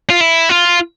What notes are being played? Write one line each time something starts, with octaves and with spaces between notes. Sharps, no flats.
F4
E4
F4